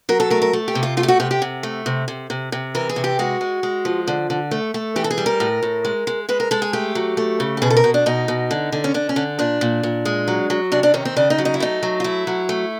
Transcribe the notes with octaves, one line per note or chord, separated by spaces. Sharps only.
F#3 A#4
A4
A3 A#4
A#4
A3
G4
C3
F4
A3 F4
G4
F#4
C3 G4
G4
C3
A3
C3
C3
C3
C3
E3 A#4
G#4
C3
G4
G#3 F#4
G#3
G#3
F3
D3
D3
A3
A3
E3 G4
A4
G#4
G3
A#4
A2
A2
G#3
G#3
G#3 B4
A#4
G#3 A4
G#4
A3 G4
F#3
A3
C#3
G4
B2 G#4
A4
A#4
B2
D4
B2 D#4
B2
D3
D3
C#4
D3 D4
C#4
D3
A#2 D4
A#2
A#2
G#3
F#3
F#3
C3 D4
D4
D#3 C#4
C4
C#3 D4
D#4
F#3
D#4
E4
A3 D#4
F#3
F4
A3 E4
F#3
A3